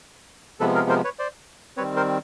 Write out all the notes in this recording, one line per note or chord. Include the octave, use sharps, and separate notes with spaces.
C3 F3 G#3 B3 A4 B4
G#4 A#4
A#4 C5
B4 C#5
C5 D5
D#3 G3 C4 B4 C#5
A#4 C5